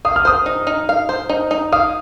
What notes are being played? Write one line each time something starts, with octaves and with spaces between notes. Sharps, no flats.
F5 D#6
F6
C5 D#6
D#4
D#4
F5
C5
D#4
D#4
F5 D#6